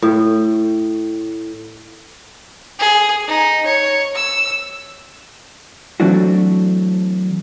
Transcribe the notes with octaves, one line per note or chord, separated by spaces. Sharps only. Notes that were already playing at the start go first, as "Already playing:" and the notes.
A2
G#4
D#4
C#5
E6
E3 F#3 A3 C4 D4 F#4